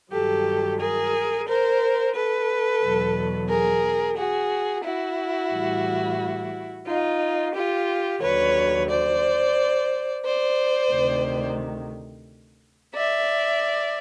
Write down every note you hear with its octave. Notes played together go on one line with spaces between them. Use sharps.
G2 D#3 F#3 G4 A4
G#4 A#4
A#4 C5
A4 B4
E2 B2 F#3
G#4 A#4
F#4 G#4
E4 F#4
A2 E3 G3
D#4 F4
F4 G4
D#2 D3 F#3 B4 C#5
C5 D5
C5 D5
D2 C3 D#3
D5 E5